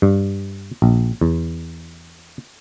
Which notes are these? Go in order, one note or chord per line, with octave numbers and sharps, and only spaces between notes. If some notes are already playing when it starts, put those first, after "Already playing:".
G2
A#1
E2